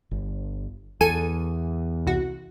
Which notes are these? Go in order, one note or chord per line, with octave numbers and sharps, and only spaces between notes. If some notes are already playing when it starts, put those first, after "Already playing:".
G1
E2 A4 G#5 D#7
C2 F#4